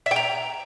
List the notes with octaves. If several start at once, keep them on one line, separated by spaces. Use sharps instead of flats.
E5
G5
A#5